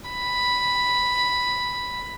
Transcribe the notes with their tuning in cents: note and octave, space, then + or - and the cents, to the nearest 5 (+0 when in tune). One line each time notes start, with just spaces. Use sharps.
B5 +0